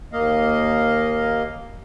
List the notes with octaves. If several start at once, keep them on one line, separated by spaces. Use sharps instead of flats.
D#2 A#3 D#5 F5